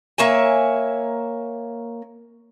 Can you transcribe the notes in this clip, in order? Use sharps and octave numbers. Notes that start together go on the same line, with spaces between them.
A#3 C#5 E5 G#5